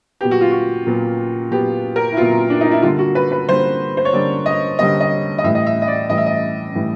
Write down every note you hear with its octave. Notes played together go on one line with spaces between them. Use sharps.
A#2 F#3 B3 G4
F#4
F4
F#4
A#2 F#3 B3
A#2 F#3 B3 G4
A#4
E4
A#2 F#3 B3 F4
D4
D#4
E4
D3 G3 A#3 F4
F#4
B4
B4
D3 G3 A#3 C5
C5
C#5
D3 G3 A#3 D5
D#5
D3 G3 A#3 D#5
D#5
D#5
A2 E3 G3 E5
D#5
E5
D#5
D5
A2 E3 G3 D#5
E5
D#5
A2 E3 G3